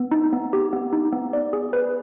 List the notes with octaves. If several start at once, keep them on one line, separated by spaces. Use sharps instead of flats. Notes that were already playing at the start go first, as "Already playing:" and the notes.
Already playing: B3
D#4
B3
G4
B3
D#4
B3
D5
G#4
B4